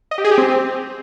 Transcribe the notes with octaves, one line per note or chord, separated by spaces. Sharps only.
D#5
G4
G#4
G4
C4